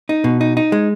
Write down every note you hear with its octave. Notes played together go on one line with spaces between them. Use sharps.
D#4
B2
D#4
D#4
G#3